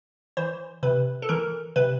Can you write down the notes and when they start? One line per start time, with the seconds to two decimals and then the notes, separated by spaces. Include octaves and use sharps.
0.37 E3 C5
0.83 C3 B4
1.22 A4
1.29 E3 A#4
1.76 C3 B4